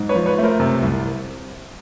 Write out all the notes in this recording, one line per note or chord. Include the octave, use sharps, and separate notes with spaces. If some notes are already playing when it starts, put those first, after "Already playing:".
Already playing: G#2
B4 C#5
F3
B4 C#5
A3
A#4 C5
C3
C2